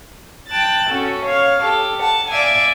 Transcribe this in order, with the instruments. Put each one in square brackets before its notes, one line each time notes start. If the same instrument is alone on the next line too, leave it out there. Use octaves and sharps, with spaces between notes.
[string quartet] G5 A5 F#6 A6
C#4 F#4 A4
C#5 F5
G4 A4
F#5 A5
D5 E5 F5 G#5